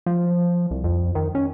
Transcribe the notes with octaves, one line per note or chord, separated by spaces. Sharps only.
F3
C2
F2
D#3
C#4